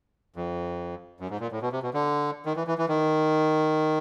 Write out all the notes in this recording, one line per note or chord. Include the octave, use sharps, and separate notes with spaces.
F2
F#2
G#2
A#2
A2
B2
C3
B2
D3
D#3
E3
E3
E3
D#3